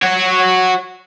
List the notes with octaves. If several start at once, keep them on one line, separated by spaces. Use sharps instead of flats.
F#4 C#5